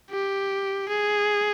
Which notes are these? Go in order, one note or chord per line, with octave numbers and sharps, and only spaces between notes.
G4
G#4